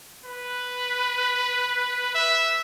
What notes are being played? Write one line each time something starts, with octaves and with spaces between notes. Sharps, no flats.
B4
E5